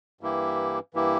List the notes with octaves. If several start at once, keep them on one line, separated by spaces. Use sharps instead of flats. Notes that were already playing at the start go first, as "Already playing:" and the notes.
G2 E3 A#3 E4 G4
G2 E3 A#3 E4 G4